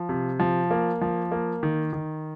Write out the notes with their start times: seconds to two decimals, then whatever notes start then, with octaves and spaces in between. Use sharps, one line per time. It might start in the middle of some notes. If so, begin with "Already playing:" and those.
Already playing: F3
0.09 C3
0.40 F3
0.71 A#3
1.01 F3
1.32 A#3
1.63 D#3
1.93 D#3